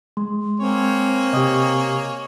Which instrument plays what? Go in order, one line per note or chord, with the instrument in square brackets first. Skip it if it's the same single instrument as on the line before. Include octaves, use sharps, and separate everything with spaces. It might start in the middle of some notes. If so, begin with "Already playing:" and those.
[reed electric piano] G#3 [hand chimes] C6
[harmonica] A#3 C#5 G#5 [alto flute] C4
[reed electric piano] C3 G4 [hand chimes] D#5 D#6